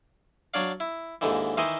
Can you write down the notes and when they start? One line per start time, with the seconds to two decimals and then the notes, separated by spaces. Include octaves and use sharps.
0.54 F#3 D4 C#5 D5 F5
0.80 E4
1.21 D#2 G#2 D3 E3
1.58 D#3 E3 E4 C5 D#5